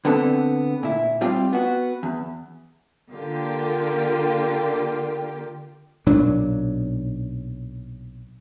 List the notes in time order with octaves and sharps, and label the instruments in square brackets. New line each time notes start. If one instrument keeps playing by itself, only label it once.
[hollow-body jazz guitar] D3 B3 C4 A4
A#2 E4
G3 C4 F4 G4
B3 F#4
E2
[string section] D3 A#3 F4 G4 G5
[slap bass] B1 A#2 F#3 D4